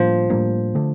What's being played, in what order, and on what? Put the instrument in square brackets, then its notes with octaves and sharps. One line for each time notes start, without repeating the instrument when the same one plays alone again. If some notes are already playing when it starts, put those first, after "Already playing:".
Already playing: [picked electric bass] A2 G3 A#3 D4 [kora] F3
[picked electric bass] A2 G3 A#3 D4
D3 A3 D4